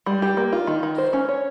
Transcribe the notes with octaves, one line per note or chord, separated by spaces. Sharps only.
G3
G4
A#3
F4
D#3
D#3
C5
C#4
C#5